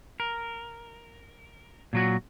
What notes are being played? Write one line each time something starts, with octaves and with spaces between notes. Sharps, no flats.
A#4
A#2 F#3 F#4